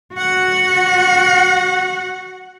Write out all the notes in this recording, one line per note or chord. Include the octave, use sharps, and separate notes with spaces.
F#4 F#5